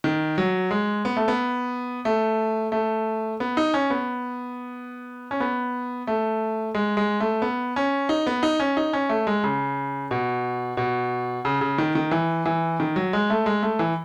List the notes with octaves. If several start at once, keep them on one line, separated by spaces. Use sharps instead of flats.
D#3
F#3
G#3
B3
A3
B3
A3
A3
B3
D#4
C#4
B3
C#4
B3
A3
G#3
G#3
A3
B3
C#4
D#4
B3
D#4
C#4
D#4
C#4
A3
G#3
C#3
B2
B2
C#3
C#3
D#3
D#3
E3
E3
D#3
F#3
G#3
A3
G#3
A3
E3